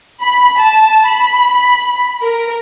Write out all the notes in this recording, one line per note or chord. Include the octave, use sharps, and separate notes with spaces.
B5
A5
B5
A#4